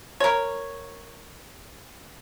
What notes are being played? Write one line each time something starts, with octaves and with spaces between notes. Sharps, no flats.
A#4 C#5